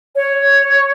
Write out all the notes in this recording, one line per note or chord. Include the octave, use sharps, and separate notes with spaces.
C#5